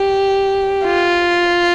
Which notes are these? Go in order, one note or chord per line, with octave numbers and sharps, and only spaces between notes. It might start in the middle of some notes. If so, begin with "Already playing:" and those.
Already playing: G4
F4